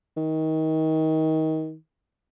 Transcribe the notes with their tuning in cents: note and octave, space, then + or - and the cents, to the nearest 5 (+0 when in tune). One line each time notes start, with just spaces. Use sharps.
D#3 +25